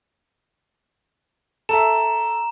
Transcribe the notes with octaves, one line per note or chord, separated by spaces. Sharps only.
A4 E5 A#5 E7